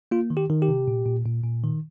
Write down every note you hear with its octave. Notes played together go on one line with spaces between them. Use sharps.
A#3 F4
D#3
G4
D#3
G4
C3
A#2
A#2
A#2
A#2
D#3